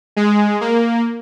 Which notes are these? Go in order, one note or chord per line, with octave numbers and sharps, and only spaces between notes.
G#3
A#3